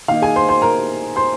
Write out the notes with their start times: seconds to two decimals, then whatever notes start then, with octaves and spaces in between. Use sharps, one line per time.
0.08 D#3 A#3 D#4 F5
0.22 G#4 G#5
0.36 C5 C6
0.49 C5 C6
0.62 A#4 A#5
1.16 C5 C6